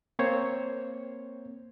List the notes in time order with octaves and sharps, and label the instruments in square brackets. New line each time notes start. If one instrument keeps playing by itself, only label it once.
[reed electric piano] A#3 C4 C5 C#5